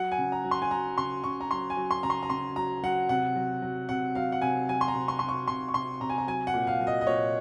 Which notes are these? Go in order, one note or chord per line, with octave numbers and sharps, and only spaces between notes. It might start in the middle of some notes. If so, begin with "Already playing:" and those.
Already playing: F#3 F#5
G#5
C#3
A#5
F#3
C6
G#5
F#3 A#5
C#3 C6
C#3 C#6
A#5
F#3 C6
G#5
F#3
C6
C#3 A#5
C6
A#5
C#3 C6
F#3 A#5
F#3 F#5
C3 F#5
F#3
F#3
C3 F#5
F#3 F5
F#5
C3 G#5
F#3 G#5
C6
A#5
C3
C6
C3 C6
C#6
C3 C6
C#6
C3 C6
C3 A#5
G#5
A#5
F#3 G#5
F#5
A#2
F5
F#3
D#5
D#5
A#2 C#5